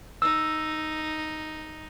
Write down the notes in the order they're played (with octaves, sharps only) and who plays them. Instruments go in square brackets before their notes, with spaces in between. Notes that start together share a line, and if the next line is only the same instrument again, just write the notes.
[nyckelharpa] D#4 [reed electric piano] E6